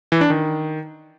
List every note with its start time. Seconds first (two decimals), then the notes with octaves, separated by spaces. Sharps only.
0.12 E3
0.21 D4
0.30 D#3